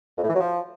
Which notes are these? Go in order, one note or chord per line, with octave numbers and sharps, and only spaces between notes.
F2
A2
E3
F#3
F3